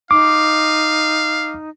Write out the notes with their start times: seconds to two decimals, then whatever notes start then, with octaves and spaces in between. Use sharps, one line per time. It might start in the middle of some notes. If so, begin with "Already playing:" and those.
0.11 D#4 F5 D6